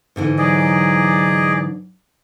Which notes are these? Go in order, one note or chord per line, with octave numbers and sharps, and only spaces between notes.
G#2 D3 E3
F#3 G#4 D5 D#5